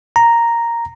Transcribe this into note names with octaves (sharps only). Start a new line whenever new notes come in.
A#5